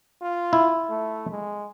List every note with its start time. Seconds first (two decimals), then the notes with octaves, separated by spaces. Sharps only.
0.22 F4
0.53 E4
0.90 A3
1.31 G#3